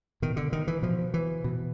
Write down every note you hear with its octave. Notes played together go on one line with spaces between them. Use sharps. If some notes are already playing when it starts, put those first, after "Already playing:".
B2 D#3
D3
D#3
E3
B2 F3
E3
B2